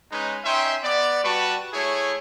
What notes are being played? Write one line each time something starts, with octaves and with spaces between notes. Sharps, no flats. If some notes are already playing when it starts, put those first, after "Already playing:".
G#3 C#4 D#4 B4
C#4 D#4 E5 G5 C6
B3 D5
G3 F#4 B4 A5 C#6
A3 E4 G#4 C#5